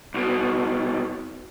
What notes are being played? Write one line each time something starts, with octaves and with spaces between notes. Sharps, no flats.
C2 B2